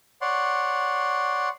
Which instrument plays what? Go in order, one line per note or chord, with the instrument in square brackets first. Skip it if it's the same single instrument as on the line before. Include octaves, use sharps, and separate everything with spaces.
[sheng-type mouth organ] C#5 D5 F#5 C6